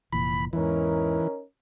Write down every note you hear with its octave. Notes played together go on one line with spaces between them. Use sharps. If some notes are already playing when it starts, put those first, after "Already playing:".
F1 A#2 E3 B5
E2 G#2 E3 C#4 D#4 A#4